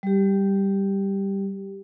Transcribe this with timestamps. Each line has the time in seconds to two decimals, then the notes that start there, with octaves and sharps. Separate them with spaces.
0.03 G3 G4